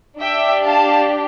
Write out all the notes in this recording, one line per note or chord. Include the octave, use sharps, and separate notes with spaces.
D4 G4 E5 G5
F5 A5